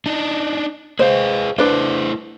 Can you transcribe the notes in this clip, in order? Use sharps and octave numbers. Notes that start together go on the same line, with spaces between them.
D4 D#4
G#4 B4 C5 D#5 F5
A3 D4 E4 B4 C5 D5